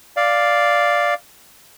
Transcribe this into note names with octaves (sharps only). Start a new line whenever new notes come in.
D5 F5